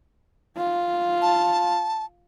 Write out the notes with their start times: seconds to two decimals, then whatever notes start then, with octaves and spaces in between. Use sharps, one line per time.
0.57 F4
1.22 A5